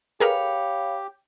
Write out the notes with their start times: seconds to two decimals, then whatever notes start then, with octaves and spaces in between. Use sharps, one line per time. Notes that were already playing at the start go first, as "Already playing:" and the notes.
0.20 G4 G#4 A#4 B4 C#5 F5 B5